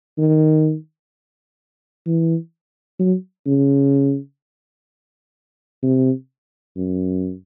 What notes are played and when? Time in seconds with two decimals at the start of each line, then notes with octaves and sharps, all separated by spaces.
0.18 D#3
2.07 E3
3.00 F#3
3.47 C#3
5.83 C3
6.77 F#2